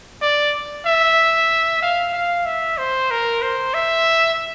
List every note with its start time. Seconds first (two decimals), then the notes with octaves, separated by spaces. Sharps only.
0.22 D5
0.86 E5
1.82 F5
2.14 F5
2.46 E5
2.78 C5
3.11 A#4
3.42 C5
3.74 E5